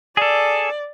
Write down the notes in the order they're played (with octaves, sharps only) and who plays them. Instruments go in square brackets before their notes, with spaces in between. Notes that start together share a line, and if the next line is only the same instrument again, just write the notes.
[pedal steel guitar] G#4 A4 [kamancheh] D5